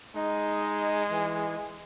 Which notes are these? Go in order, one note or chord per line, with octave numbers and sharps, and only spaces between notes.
G#3 D#4
E3